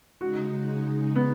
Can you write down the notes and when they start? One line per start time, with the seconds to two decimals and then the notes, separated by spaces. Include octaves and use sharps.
0.21 C#3 G#3 D#4 F#4
1.15 B3